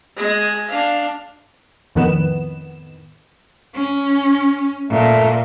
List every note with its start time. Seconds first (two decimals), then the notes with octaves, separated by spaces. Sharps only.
0.16 G#3 G#5
0.69 D4 F5
1.95 F2 A2 D#3 B3 B4 E7
3.75 C#4
4.90 A#2 A3